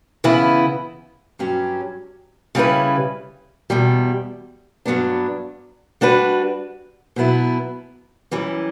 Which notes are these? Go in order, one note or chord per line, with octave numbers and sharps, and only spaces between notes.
C#3 E3 B3 E4
G2 F#3 C#4 G4
C#3 G3 C#4 E4 B4
E2 B2 G3
G2 F#3 B3 D4
G3 D4 F#4 B4
B2 F#3 B3 E4
F#2 E3 G3